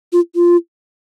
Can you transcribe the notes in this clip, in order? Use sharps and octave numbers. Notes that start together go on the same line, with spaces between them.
F4
F4